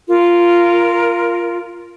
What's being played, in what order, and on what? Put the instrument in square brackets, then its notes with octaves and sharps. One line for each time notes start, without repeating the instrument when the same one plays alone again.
[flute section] F4 A#4